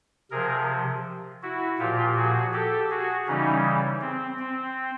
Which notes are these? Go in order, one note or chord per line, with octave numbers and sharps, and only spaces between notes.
C3 F3 G#4 A#4
E4 F#4
A#2 F3 F4 G4
F#4 G#4
G4 A4
F#4 G#4
C#3 E3 G3 C#4 D#4
C4
C4